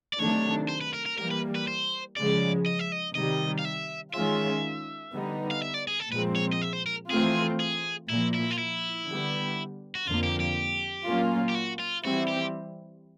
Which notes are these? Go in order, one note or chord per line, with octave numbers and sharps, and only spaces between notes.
D5
C3 D#3 F#3 A3 D4 C#5
C5
B4
A#4
A#4
E3 G3 A#3 A#4
B4
B4
C5
C#3 F3 G#3 D5
D#5
E5
D#5
C3 D#3 G3 D#5
F5
E5
D#3 G#3 C#4 F4 E5
D3 G3 B3 D#4
F5
E5
D5
G#4
A4
A#2 F3 G#3 C4 B4
C#5
D#5
E5
C5
A#4
E3 A3 C4 F4 G#4
G#4
A#2 F3 A#3 E4
E4
F4
E4
D3 G3 B3
F#4
F2 D3 F3 A#3 F4
G4
G4
A#2 F#3 A#3 C#4 F4
G4
F#4
F4
E3 G3 C4 E4 F#4
G4